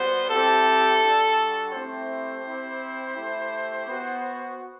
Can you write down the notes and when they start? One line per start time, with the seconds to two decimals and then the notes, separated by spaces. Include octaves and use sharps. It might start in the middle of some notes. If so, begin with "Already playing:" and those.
Already playing: G3 B3 F#4 C5
0.29 G3 C4 E4 G4 A4
1.02 G3 D4 F#4
1.73 A3 C4 E4 G4 C5
2.44 C4 E4 G4
3.16 A3 E4 G4
3.87 B3 F#4